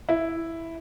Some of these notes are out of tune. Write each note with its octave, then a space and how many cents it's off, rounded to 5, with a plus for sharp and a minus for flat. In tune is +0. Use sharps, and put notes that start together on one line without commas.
E4 +0